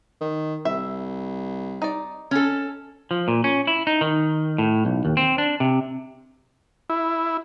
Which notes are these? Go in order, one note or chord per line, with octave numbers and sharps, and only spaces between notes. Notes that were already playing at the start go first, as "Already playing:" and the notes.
D#3
C2 E5
D#4 D5
C#4 A4
F3
A#2
C#4
E4
D#4
D#3
A2
B1
D#2
C4
D4
C3
E4